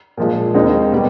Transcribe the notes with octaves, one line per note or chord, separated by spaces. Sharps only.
A#2 F3 G#3
D#2 D#3 G#3 C4 D#4
B2 G3 B3